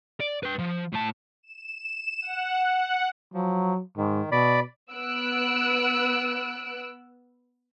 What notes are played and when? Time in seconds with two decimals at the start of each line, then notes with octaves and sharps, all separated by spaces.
0.20 D5
0.43 B4 G5
0.59 F3
0.93 A2 A5
1.43 E7
2.22 F#5
2.69 F#5
3.34 F3 F#3
3.97 G#2 D#3
4.32 B2 D5 B5
4.93 B3 E6 F#6 D7